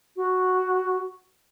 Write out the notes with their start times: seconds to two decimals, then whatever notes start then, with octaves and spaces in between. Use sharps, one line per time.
0.16 F#4